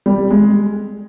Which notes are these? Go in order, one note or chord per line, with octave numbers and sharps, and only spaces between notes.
G3
G#3